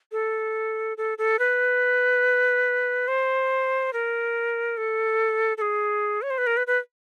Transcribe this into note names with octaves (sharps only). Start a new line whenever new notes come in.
A4
A4
A4
B4
C5
A#4
A4
A4
G#4
C#5
C5
B4
A#4
B4
B4